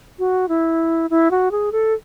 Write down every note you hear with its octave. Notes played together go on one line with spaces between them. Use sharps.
F#4
E4
E4
F#4
G#4
A4